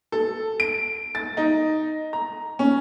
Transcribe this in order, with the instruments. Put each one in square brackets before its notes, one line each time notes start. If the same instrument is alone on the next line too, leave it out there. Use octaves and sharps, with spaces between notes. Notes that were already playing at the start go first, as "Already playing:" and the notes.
[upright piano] A4
D7
A6
D#4
A#5
C#4